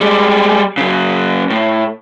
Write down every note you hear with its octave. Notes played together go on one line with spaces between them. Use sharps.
G3 G#3
C#3 F#3
A2